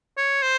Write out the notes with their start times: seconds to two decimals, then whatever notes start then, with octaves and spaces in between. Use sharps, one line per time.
0.17 C#5
0.42 C5